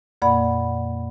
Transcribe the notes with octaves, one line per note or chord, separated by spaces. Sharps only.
F2 A#2 A#3 D5 F#5 B5